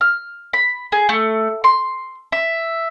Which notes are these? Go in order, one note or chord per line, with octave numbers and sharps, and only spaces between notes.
F6
B5
G#4
A3
C6
E5